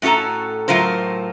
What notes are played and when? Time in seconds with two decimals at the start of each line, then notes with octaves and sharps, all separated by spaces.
0.02 A2 C#4 F#4 A4 A#5
0.68 A2 F#3 F4 A#4 C5